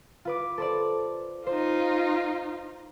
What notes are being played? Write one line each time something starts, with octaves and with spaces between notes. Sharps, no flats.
F4 B4 D6
A4 C5 D5
D#4 F4 C5